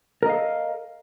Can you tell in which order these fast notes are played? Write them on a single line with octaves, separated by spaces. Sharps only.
A#4 D#5 F5 A4